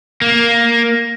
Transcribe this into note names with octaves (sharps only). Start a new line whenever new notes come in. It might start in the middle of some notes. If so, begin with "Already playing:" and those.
A#3